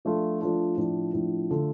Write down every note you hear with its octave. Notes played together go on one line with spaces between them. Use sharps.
F3 A3 D4 F4 A4
F3 A3 D4 F4 A4
A2 F3 D4
A2 F3 D4
D3 A3 F4 A4